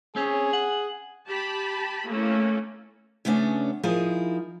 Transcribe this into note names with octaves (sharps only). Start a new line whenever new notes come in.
C4 C#4 G#4 C#5
F#5
G4 A5 B5
A3 A#3 C#4 E4
C#3 A3 B3 C#4 D4
F3 D#4 E4 G#4 A#4